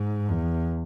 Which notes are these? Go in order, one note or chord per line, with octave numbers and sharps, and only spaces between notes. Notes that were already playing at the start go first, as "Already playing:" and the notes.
Already playing: G#2
E2